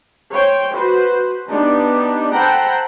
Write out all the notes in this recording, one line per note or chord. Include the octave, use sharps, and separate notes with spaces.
C5 C#5 G5
F#4 B4 C5
B3 D4 D#4 G4
A4 C5 F#5 G5 A#5 B5